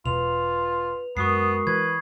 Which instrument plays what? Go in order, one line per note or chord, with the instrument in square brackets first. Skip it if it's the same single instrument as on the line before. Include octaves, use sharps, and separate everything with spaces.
[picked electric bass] E1 B2 [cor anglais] F4 [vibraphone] B4 [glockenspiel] F7
[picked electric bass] F#2 [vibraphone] G#3 F#4 A#4 [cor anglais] B3 [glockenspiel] C#6 D#6 C7
[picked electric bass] E3 [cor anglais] B4 [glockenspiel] G#6